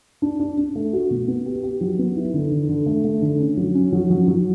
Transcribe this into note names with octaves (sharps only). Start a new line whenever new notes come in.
D4
D4
D4
A3
F#4
B2
B3
G4
G4
F#3
B3
E4
D3
D3
D3
A3
A3
D3
C#4
F#3
C#4
F#3
F#3
F#3